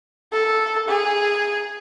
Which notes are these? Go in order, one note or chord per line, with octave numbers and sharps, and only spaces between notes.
A4
G#4